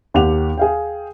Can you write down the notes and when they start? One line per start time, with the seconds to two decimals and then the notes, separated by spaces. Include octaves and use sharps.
0.14 D#2 G4 F#5 F7
0.58 G#4 F5 G5